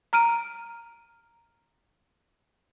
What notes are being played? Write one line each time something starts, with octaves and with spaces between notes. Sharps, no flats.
A#5 F6 D7 D#7